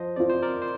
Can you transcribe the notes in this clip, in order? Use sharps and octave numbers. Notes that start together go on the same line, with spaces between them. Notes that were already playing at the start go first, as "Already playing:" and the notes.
Already playing: F3 C5 D#5
C4 F4 D5
C5
A#4 D5
C5